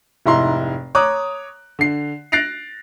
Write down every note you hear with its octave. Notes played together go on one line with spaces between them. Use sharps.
F1 G#2 E4 A#5 C6
C#5 A#5 D6 D#6 F#6
D3 C7
F#6 A6 A#6 C7 D7 F7